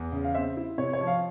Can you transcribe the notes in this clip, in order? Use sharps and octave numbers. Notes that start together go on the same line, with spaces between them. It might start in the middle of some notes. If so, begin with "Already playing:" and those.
Already playing: E2
C#3
F5
C4 E5
E4
C3 C#5
C#5
F3
F5